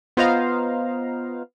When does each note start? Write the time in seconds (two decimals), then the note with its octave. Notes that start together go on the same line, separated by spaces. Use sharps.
0.17 B3 F4 C5 D#5 F5 A#5